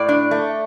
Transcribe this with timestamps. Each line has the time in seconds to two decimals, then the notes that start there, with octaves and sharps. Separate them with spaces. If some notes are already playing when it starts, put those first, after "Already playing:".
Already playing: A2 D5
0.09 D4
0.31 A3